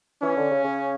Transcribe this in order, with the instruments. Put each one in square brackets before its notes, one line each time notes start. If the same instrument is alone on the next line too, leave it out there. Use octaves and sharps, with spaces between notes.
[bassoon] E3 [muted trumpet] C#4
[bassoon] D3
C#3
C#3